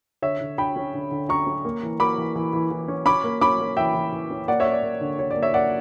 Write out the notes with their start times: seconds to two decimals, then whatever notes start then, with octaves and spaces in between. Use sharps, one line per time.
0.22 D3 C#5 E5
0.41 D3
0.58 D3 G5 B5
0.76 C#4
0.94 D3
1.11 D3
1.29 C#4 A#5 C#6
1.47 C#4
1.65 A#3
1.83 E3
2.00 A#3 B5 D6
2.18 E3
2.35 E3
2.53 E3
2.71 E3
2.88 C#4
3.06 C#4 B5 D6
3.24 A#3
3.41 C#4 B5 D6
3.60 A#3
3.77 E3 E5 G5
3.94 E3
4.12 E3
4.31 C#4
4.48 A#3 D5 F#5
4.60 C#5 E5
4.66 C#4
4.72 D5
4.83 A#3
5.01 D3
5.19 D3 C#5
5.31 D5
5.36 A#3
5.42 C#5 E5
5.54 A#3 D5 F#5